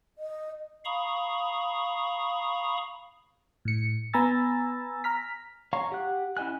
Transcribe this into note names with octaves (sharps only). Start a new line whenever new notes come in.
D#5
F5 A#5 B5 C#6 D#6
A2 C#7
B3 G#5 A#5 B5 E6 A6
A#5 F6 B6
C#5 F5 A#5 C#6
G4 F#5 F#6
C#4 E4 D#5 G#5 F#6